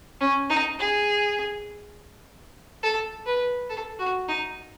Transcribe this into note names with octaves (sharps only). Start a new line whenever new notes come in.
C#4
D#4
G#4
A4
B4
A4
F#4
D#4